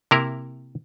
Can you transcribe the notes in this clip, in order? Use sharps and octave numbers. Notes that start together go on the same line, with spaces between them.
C3 A#3 E4 A#4